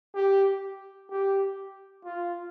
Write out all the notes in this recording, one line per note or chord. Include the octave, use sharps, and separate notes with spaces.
G4
G4
F4